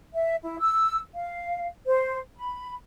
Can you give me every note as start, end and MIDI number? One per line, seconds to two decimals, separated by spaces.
0.13 0.35 76
0.43 0.59 64
0.60 0.98 88
1.15 1.66 77
1.86 2.17 72
2.37 2.75 83